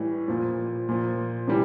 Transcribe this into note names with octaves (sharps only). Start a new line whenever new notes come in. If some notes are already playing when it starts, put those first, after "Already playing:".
Already playing: A2 E3 G3
A#2 F3
A#2 F3
C3 E3 G3